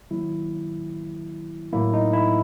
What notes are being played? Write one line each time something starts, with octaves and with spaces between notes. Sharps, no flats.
D#3 F#3 A#3 E4
A2 F#3 A#3 E4
D#4
E4